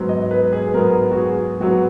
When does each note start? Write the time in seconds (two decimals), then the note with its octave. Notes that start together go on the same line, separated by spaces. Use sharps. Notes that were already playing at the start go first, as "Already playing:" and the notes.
Already playing: G#2 F#3 B3
0.09 D#5
0.31 B4
0.53 G#4
0.74 G#2 F#3 B3 A#4
1.12 F#4
1.17 G#4
1.60 G#2 F#3 B3 F#4